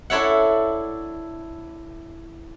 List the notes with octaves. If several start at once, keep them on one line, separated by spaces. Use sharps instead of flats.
D4 E4 A4 C#5 E5 F#5